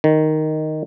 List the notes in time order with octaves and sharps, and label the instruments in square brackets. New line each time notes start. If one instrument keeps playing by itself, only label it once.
[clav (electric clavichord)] D#3